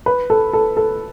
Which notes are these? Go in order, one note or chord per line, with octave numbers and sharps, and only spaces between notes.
B4
A4
A4
A4